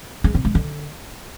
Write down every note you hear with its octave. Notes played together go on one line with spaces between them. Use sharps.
G#3
C3
G#3
D3